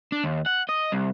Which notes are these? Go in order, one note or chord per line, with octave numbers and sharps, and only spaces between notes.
D4
D#2
F#5
D#5
C2